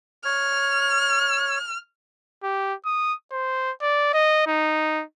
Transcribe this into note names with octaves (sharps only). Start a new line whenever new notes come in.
C#5 F6
G4
D#6
C5
D5
D#5
D#4